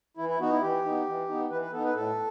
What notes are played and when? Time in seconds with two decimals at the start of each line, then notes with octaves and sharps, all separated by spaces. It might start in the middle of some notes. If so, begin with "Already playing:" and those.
0.17 E3 E4
0.29 E4
0.40 B3 D#4 F#4
0.51 E4
0.61 E3 G4
0.85 B3 D#4
1.06 E3
1.28 B3 D#4
1.50 E3 B4
1.61 B4
1.72 B3 D#4 A4
1.84 B4
1.94 A2 A4